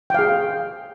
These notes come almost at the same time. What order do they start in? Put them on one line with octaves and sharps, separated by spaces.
G5 F5 G#4